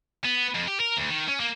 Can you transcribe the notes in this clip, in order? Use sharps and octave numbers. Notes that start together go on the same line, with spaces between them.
B3
F2
G4
A#4
D2
D#3
C#4
A#3